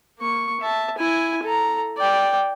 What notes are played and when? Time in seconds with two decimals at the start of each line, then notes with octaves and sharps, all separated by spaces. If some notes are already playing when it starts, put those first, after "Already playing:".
0.19 A#3 C#6
0.60 E5 A5
0.98 E4 G#5
1.43 A4 A#5
1.97 D5 G5